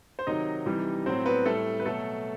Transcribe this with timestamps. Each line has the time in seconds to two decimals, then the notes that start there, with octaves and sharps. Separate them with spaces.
0.19 C5
0.27 C3 D#3 F#3 D#4 D#5
0.66 C3 E3 G3
1.06 A2 F#3 C4 C5
1.26 B3 B4
1.45 A2 G3 A3 A4
1.80 B4
1.85 B2 F#3 A3 A4